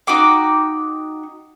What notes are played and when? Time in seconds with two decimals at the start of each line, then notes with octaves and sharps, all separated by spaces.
0.07 D#4 F#4 G5 D6